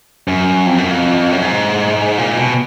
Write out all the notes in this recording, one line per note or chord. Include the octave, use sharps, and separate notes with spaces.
F#2
F2
F#2
F2
F#2
G#2
A#2
B2